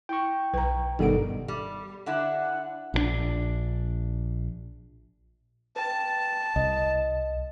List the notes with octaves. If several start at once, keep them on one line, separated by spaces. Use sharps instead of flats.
E4 G5 C#6
B1 B4 A#5
G1 G2 B2 D#3 B3 A4 F#5 D7
G3
D3 D4 E4 F#5
A#1 C#3 D4
B4 G5 A5
C2 D#5